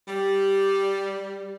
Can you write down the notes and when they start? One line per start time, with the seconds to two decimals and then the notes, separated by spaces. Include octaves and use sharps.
0.08 G3